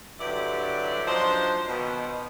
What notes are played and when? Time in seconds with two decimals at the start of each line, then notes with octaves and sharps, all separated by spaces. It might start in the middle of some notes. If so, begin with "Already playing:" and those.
0.20 G2 D3 F#3 E4 G4 D5
1.07 F3 F#3 D4 D#4 C5
1.68 B2 D#3